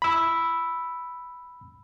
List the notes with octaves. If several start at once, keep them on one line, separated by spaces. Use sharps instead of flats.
B5 E6